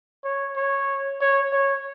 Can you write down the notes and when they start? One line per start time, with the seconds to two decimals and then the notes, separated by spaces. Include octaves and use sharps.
0.24 C#5
0.57 C#5
1.21 C#5
1.53 C#5